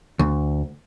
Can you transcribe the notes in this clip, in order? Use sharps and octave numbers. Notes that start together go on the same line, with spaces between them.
D2